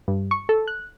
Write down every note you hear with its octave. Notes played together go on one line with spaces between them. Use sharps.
G2
C#6
A4
F#6